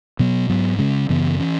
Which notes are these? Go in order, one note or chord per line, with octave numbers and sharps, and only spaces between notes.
B2 F#3 B3
G#2 F#3 B3
C#3 G#3 C#4
F#2 C#3 E3 B3
E3 C#4